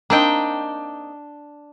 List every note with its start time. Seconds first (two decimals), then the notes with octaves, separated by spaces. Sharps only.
0.10 A#3 C4 D4 D#4 G5